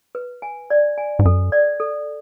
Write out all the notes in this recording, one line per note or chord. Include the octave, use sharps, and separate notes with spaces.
B4
G#5
D5
G#5
G#2
F#2 A4
D5
A4